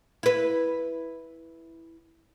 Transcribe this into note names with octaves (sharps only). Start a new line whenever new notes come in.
E4 B4